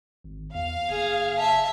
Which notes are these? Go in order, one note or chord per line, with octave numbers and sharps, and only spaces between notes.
G#1
E2 F5
F#1 G#4
E5 A5